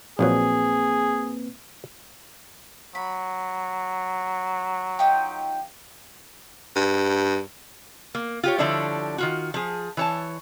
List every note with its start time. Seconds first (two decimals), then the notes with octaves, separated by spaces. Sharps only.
0.19 A#1 F3 F#3 A#3 C4 G#4 B4
2.95 F#3 B5
4.99 D#4 F4 G4
6.76 G2
8.15 A#3
8.44 F4 G4 C#5
8.58 D3 F3 G3 D4 E4 C#5
9.18 D#3 F4 F#4
9.54 F3 G#4
9.97 E3 C#5 A5